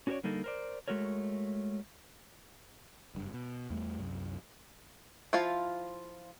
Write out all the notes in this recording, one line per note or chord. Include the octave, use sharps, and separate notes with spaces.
C#4 F#4 G4 A#4 C#5 D5
D3 G3 A#3 D#4 A4
A#4 C5 D5
G#3 A3 F#4 A#4 C#5
F#1 G2
B2
E2 G3 A3
C2 F#2
F3 E4 F4 F5